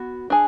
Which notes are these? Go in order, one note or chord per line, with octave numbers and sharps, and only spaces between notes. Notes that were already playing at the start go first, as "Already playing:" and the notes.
Already playing: B3 F#4
D4 G#4